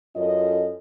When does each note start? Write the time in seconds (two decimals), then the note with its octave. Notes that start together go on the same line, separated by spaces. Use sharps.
0.16 F#2 C#4 F4 A4 D#5